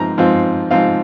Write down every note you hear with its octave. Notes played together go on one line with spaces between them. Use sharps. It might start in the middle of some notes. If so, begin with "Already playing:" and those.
Already playing: G#2 F3 C4 A#5
G#2 F3 C4 F4
G#2 F3 C4 F4 F5